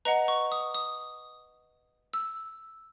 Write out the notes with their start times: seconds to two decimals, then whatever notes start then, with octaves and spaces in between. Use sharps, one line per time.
0.05 B4 D#5 F#5 A#5
0.28 C#6
0.52 D#6
0.74 D#6
2.13 E6